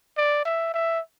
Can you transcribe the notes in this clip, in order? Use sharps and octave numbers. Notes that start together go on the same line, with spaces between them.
D5
E5
E5